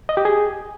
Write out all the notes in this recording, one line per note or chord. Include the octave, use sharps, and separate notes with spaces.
D#5
G4
G#4